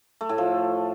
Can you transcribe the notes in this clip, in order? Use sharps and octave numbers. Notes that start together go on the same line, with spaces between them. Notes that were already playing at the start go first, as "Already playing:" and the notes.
A3
A2
F3